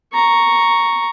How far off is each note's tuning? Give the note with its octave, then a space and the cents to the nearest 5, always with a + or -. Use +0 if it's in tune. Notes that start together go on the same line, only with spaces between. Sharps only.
A#5 +0 C#6 +0